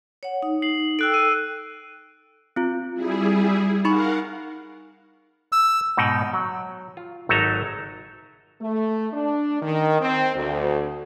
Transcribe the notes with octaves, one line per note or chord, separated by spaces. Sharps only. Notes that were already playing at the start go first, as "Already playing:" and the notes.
C#5 F#5
D#4
C7 F#7
A4 G5 E6 F#6 D7
E6 D#7
C4 F4
G3 E4 G#4
D#4 A#4 F5 F#5 B5 C#6
E6
G#2 B2 D#4 F#5 G5
F#3
F4
G#1 F#3 D#4 A4 E5 A#5
A3
D4
D#3
C4
D2